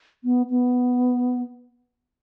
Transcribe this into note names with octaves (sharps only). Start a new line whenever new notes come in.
B3
B3